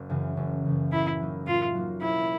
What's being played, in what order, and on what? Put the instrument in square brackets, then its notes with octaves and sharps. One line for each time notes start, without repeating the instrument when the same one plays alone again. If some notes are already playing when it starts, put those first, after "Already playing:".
Already playing: [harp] F#1
F#2 C#3 E3
F#1
F#2 C#3 E3
[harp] A2 [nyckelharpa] E4
[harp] F#3 A#3 D#4
[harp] A2 [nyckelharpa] F4
[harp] F#3 A#3 D#4
[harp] E1 [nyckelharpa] E4